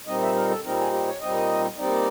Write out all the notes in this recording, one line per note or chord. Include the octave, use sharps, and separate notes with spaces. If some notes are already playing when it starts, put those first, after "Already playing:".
A#2 G3 C4 D#4 D#5
E5
A#4
A4
A#2 G3 C4 D#4 A#4
G#4
G4
C#5
A#2 G3 C4 D#4 D#5
A#2 G3 C4 D#4 D5